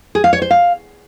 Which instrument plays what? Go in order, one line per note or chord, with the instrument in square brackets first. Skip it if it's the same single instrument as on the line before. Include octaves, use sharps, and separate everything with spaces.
[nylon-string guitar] G#4
F5
C#5
C5
F5